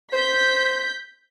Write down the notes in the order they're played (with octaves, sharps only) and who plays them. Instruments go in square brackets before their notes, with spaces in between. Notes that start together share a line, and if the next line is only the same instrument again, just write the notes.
[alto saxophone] C5 [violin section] G6 B6